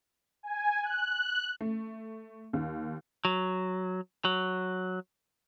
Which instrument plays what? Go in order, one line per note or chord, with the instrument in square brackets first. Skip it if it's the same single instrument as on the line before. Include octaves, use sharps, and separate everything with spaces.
[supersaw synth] G#5
F#6
[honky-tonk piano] A3
D#2
[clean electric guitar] F#3
F#3